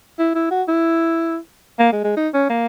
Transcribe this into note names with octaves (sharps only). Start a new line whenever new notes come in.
E4
E4
F#4
E4
A#3
G#3
G#3
D#4
C#4
A#3